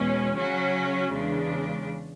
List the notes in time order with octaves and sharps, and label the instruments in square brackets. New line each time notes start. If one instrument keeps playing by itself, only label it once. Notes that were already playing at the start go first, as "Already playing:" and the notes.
Already playing: [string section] E2 B2 G#3 C#4
C#3 F#3 C#4 F#4
E2 C#3 G#3 D4